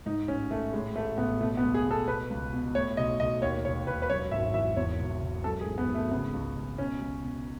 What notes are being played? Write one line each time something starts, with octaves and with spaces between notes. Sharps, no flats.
G#2 D#4
A1 C#4
A1 A3
A2 G#3
A1 A3
A1 B3
B2 A3
B3
C#2
G#4
B2
A4
B2 B4
C#2
B2
A2 C#5
B1 D#5
B1 D#5
D#2 C#5
E1 C#5
E1 B4
B4
F#2 C#5
G#1 E5
E3 E5
E2 C#5
E1
E1
F#2 A4
G#4
G#1
B3
G#1
A3
C#3 B3
C#2
C#2
B2 C#4
C#2
B2